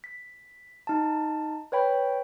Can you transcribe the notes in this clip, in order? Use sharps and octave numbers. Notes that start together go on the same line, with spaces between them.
B6
D#4 A5
B4 C#5 G5 B5